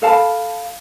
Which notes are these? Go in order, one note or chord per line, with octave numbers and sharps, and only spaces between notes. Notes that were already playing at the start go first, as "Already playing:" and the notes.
A4 F5 A5 B5